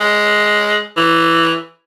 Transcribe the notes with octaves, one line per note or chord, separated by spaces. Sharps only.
G#3
E3